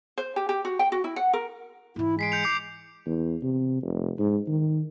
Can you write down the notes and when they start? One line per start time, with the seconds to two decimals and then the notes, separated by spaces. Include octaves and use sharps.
0.18 C5
0.36 G4
0.49 G4
0.65 F#4
0.79 G5
0.92 F#4
1.04 E4
1.16 F#5
1.33 A#4
1.96 G#2 E3 E4
2.19 G#3 B6 C7 D7
2.32 G6 C#7 F7
2.44 D6 G6 C7
3.06 E2
3.42 C3
3.82 F1
4.19 G#2
4.48 D#3